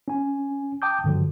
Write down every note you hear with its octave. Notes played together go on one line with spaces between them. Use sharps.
C#4 G#5
G5 A5 D6 D#6 G6
G2 D3 F3 F#3